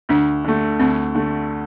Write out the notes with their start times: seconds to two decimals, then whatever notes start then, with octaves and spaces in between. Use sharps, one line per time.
0.09 D2 D4
0.45 D3 A3
0.80 D2 C4
1.15 D3 A3